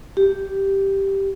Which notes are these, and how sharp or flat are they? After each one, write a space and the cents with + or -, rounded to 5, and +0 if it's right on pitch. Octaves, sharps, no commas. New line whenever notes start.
G4 -5